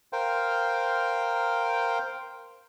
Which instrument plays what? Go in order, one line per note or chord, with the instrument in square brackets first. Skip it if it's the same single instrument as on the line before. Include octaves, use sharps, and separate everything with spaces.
[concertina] A#4 C5 F5 G5